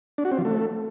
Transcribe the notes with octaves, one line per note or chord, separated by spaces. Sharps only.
D4
F#4
C4
F3
A3